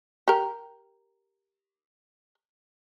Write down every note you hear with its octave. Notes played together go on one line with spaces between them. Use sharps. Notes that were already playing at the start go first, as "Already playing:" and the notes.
G4 A#4